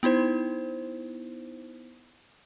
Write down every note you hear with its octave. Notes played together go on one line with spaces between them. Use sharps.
B3 D#4 E4 C5